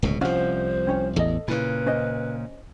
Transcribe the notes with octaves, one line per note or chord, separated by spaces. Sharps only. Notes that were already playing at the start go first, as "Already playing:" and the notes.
D1 C#2 B2
C2 F3 C#4 C5 F5 F#5
C4 C#4 C#5
A1 E2 A4 D#5
A#2 C#3 E4 B4
C#4 C5 D#5